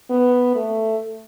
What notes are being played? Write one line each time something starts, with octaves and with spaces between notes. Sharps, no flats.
B3
A3